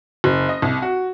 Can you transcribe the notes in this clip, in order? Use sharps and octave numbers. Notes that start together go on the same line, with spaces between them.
F#1
D#5
C2
F#4